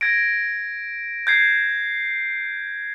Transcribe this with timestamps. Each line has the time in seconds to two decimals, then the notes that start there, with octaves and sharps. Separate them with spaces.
0.01 G#6 A#6 D7
1.27 G6 G#6 C7